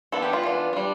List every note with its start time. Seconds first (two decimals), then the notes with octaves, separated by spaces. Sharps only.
0.12 E3 B3 D4 A4
0.22 G4
0.33 F4
0.44 E3 B3 D4
0.73 G3 D4